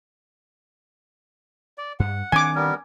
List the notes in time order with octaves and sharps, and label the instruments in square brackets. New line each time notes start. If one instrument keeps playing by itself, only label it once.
[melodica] D5
[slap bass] G2 [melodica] F#5
[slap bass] D#3 C4 D4 [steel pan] G#5 D6
[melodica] G3 B3 A#4